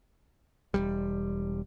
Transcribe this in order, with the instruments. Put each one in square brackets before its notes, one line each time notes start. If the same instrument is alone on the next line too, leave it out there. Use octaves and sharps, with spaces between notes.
[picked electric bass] E1 B1 G3